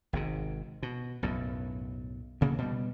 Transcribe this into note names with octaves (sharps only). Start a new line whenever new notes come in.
G#1 G#2 C3
B2
B1 F#2 A2
D2 C#3 A#3
B2 G3